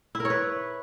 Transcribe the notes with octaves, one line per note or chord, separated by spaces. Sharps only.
E4
A#4
C#5
B4